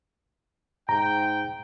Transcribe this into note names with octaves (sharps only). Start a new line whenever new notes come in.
G#2 G5 A#5